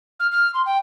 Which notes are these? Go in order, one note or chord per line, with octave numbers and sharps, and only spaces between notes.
F6
F6
C6
G5